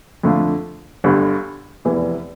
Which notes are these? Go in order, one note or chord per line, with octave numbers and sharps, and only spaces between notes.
F2 D3 A3 D4 F4
G1 G2 D3
F1 E2 E3